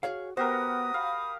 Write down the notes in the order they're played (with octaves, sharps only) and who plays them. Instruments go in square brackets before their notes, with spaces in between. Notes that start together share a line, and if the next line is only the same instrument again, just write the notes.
[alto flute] F#4 [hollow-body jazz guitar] G#4 C#5 F5
[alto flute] B3 [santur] F#4 G4 A#4 [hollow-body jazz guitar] C5 [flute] D#6
[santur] F5 [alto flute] B5